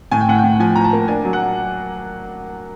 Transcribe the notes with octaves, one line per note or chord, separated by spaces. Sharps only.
A2 G#5
G5
A2 F#5
G5
A2
F3 G#5
A2 A#5
A5
A#3
D4 G#5
F#3
F#5